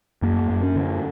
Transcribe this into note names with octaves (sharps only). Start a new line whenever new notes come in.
F#2 A#3
F#2
C#4
D3